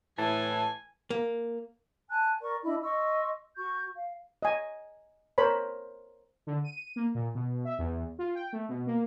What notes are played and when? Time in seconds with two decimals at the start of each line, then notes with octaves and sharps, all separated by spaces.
0.18 A2 E3 G#5 A5
1.10 A#3
2.11 G#5 A5 F#6
2.41 A#4 D5 C#6
2.63 D4 E4 D#5 B5
2.82 D#5 C6 C#6 E6
3.56 F#4 C#6 G6
3.95 F5
4.42 D#5 G#5
5.38 A#4 C5 C#5 B5
6.47 D3
6.64 D#7
6.96 A#3
7.15 A#2
7.35 B2
7.65 E5
7.79 E2
8.19 F4
8.35 G5
8.53 A3
8.69 B2
8.87 A#3